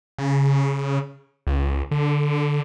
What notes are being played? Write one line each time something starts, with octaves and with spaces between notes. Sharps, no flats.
C#3
C#2
D3